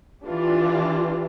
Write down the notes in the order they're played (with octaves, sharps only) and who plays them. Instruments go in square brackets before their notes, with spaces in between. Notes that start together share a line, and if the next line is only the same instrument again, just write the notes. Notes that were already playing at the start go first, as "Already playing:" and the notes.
[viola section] E3 D4 F4 G4